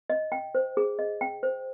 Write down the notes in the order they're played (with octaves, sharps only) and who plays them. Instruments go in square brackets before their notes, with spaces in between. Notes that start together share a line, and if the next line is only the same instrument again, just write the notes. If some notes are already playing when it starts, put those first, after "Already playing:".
[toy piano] D#5
G5
C5
G#4
D#5
G5
C5